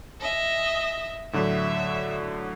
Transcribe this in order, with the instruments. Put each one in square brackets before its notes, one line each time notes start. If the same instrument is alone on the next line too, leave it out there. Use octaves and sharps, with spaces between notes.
[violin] D#5 E5
[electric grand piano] A2 D3 F#3 [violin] E5